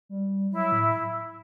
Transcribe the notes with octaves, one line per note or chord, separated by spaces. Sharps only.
G3
F#3 E4
A2